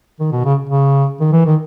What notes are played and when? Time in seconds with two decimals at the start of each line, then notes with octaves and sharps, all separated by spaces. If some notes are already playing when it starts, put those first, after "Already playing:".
0.20 D#3
0.32 B2
0.45 C#3
0.69 C#3
1.20 D#3
1.33 E3
1.46 D#3